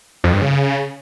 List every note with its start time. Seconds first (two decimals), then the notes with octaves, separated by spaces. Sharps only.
0.24 F2
0.33 G2
0.42 C#3